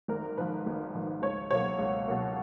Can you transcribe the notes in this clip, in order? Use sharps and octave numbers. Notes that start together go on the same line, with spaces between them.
G#1 A#4
G#2 F3 B4
G#1
G#2 F3
C#2 C#5
B2 F#3 A#3 C#5
C#2
B2 F#3 A#3